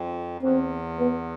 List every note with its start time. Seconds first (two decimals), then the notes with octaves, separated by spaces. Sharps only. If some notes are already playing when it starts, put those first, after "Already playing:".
Already playing: F2
0.42 E2 C4
0.99 B3